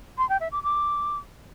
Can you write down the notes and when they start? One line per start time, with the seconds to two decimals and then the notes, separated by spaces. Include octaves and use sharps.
0.18 C6
0.29 G5
0.41 E5
0.52 D6
0.63 D6